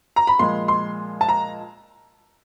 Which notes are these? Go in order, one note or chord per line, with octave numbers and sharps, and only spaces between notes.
A#5
B5
A#2 F3 G#3 C6
C6
A5
A#5